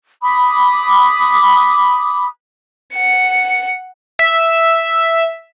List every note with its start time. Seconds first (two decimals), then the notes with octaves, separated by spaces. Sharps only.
0.23 B5 D6 D#6
2.94 F#5 C#7
4.19 E5